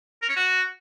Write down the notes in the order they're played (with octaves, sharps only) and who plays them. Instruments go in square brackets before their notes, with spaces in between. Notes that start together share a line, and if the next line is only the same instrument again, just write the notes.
[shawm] A#4
C#4
F#4